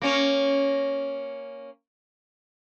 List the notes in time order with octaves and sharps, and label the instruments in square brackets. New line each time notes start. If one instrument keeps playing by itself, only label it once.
[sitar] A#3 C#4 C#5